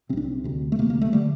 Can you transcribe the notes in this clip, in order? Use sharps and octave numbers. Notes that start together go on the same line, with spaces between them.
C2 C3 C4 D4
C4
D2 C3
A3
D2 C3 A#3
A#3
A3
D3 G3